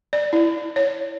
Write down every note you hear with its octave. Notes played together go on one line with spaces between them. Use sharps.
D5
E4
C#5